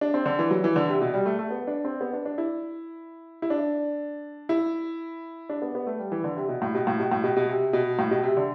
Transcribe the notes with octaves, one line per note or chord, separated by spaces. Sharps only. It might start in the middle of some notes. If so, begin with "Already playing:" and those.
D4
C4
D3
E3
F#3
E3
D3
C3
B2
G3
A3
A3
B3
D4
C4
B3
D4
D4
E4
E4
D4
E4
D4
B3
B3
A3
G3
E3
D3
C3
B2
A2
B2
A2
B2
A2
B2
B2
C3
B2
A2
B2
C3
D3